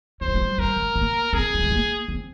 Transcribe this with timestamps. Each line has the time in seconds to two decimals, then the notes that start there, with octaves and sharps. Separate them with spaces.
0.21 G3 C5
0.28 G#3
0.35 G3
0.58 G3 A#4
0.77 G#3
0.96 A#3
1.33 C4 G#4
1.54 G3
1.63 G#3
1.71 A#3
2.08 C4